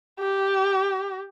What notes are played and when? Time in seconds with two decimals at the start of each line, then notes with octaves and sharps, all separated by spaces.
0.20 G4